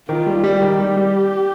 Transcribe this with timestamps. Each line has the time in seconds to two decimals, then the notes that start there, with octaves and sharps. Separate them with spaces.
0.09 D#3 F4
0.26 G3
0.44 G3 G4
0.61 D#3
0.79 G3 G4
0.96 G3